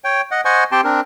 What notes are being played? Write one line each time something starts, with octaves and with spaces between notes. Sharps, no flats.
C#5 G5
D#5 F#5
C5 D#5 F#5 G#5 C#6
C4 G4 G5 A5 C6
C4 D4 A#4